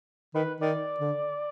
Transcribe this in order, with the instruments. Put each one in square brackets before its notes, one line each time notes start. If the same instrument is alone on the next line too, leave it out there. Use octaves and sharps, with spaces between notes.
[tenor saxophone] D#3 [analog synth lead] B4
[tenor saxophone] D#3 [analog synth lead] D5
[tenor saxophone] D3